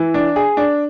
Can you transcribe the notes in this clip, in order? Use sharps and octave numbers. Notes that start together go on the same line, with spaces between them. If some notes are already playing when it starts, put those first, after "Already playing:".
Already playing: E3
D4
G#4
D4